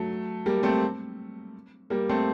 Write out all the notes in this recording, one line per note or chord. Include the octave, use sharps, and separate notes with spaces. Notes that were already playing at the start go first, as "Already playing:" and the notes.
Already playing: F#3 A3
G3 A#3
A3 C4
G3 A#3
A3 C4